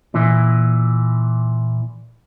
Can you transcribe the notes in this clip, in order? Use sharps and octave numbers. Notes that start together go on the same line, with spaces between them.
A#2 E3